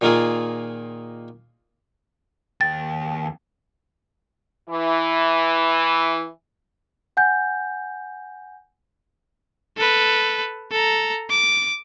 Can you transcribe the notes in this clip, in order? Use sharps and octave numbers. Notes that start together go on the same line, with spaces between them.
A#2 D#3 A#3 F4 G#4
D#2 G5 A6
E3 E4
F#5 G#5 G6
A4 B4
A4 A#5
D6